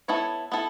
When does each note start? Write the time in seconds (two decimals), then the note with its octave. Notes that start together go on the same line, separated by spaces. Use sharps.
0.08 B3 E4 A4 C#5
0.52 B3 E4 A4